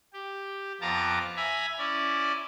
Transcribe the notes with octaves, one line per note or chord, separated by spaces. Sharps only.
G4
F2 B3 F4 A5 A#5 D6
E5 G#5 A#5 B5
C#4 E4 D5